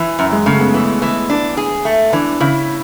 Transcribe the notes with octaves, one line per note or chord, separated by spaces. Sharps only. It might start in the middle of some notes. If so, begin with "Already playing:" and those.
Already playing: E3
F#2
G#3
C#3 A3
B3
E3
E3
D4
G#4
A3
E3 D4
C#3 E4